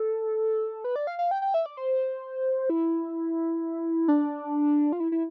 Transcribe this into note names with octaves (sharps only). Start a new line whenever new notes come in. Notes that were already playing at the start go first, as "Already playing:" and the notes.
Already playing: A4
B4
D5
F5
F5
G5
G5
E5
D5
C5
E4
D4
F4
E4
E4